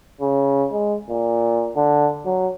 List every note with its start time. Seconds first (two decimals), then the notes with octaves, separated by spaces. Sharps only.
0.21 C#3
0.72 G#3
1.10 A#2
1.76 D3
2.25 F#3